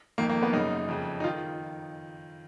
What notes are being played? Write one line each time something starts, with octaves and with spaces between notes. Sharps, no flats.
F2 D#3 A#3
A#3
B3
F#2 C#3 D#4
F2 C#3
D#4
D#3 F4